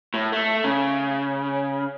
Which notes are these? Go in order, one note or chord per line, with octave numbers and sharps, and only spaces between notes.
A2
A3
C#3